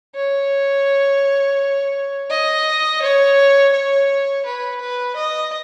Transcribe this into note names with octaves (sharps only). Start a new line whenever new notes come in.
C#5
D#5
C#5
C#5
B4
B4
D#5